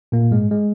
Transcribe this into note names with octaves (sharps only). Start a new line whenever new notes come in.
A#2 A#3
G#2 G#3
G#3